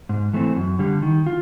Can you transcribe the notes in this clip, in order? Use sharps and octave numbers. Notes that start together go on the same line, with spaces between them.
G#2
E3 A3 C4
F#2
D3 G3
D#3
F4